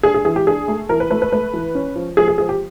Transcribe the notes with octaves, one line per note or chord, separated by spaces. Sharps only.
D4 G#4
G#4
E3 G#4
G4
D4 G#4
A3
E3 A#4
B4
A3 B4
B4
A3 B4
E3
C#4
F3
F3 G#4
G#4
F3 G#4
G4